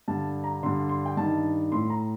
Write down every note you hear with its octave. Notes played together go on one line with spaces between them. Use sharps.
G2 D3 A5
A#5
G2 D3 C6
C6
G5
G2 D#3 A5
A2 C6
A#5